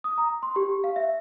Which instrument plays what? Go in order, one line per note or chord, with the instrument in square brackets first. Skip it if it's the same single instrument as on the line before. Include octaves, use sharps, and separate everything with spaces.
[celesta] D#6
A#5
C6
G4
F5
E5